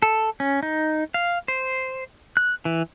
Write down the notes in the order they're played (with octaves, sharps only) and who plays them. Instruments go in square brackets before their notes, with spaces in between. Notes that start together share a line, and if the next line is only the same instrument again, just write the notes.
[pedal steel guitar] A4
C#4
D#4
F5
C5
F#6
E3